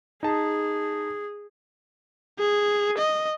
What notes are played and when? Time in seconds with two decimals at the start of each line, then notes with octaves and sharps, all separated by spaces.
0.23 D#4 G#4 A5
2.39 G#4
2.98 D#5